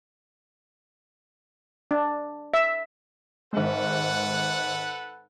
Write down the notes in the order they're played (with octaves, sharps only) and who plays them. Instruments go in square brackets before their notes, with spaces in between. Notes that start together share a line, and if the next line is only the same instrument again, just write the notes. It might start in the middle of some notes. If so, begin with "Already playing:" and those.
[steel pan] D4
E5
[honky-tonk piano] G#1 G#3 [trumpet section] A4 B4 F#5